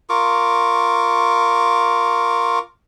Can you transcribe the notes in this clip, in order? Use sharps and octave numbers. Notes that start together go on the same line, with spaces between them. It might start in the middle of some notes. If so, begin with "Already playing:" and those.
F4 A#4 C#6 D6